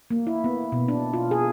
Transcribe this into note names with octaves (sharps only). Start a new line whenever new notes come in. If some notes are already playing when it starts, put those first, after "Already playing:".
A#3
E4
B3
B2
D4
F4
G#4